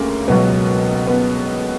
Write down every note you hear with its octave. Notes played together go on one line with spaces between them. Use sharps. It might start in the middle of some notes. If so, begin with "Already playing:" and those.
Already playing: D2 C#3 A#3 C#4
C#2 B2 F#3 B3
B3